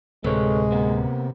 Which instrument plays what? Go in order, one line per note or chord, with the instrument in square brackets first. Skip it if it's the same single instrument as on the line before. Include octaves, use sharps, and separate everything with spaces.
[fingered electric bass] D1 [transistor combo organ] C3 [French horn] G#3 [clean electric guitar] A4 B4 C#5
[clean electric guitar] A#3 B3